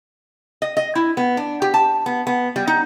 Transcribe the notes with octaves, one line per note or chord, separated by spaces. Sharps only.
D#5
D#5
E4
B3
D4
G4
A5
B3
B3
G3
D#4